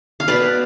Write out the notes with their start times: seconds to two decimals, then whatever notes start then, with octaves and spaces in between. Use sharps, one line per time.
0.20 F5
0.28 B2 B4 D5